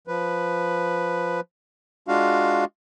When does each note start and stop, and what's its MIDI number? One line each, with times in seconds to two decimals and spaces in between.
0.07 1.40 53
0.07 1.40 71
2.08 2.65 56
2.08 2.65 62
2.08 2.65 65
2.08 2.65 66
2.08 2.65 77